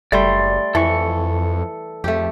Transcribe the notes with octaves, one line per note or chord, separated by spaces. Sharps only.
F#1 G3 A3 D5 C6
F2 E3 A4 C#6
F2 A3 G4